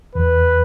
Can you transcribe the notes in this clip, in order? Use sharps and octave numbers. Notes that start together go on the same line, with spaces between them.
E2 B4